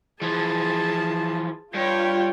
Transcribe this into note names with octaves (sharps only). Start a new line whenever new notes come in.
E3 F3 G#4 A5
G2 F4 C#5 G5